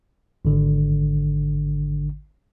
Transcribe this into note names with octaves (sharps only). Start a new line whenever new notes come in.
G#1 D3